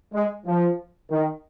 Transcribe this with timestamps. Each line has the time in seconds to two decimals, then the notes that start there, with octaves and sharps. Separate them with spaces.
0.13 G#3
0.46 F3
1.11 D#3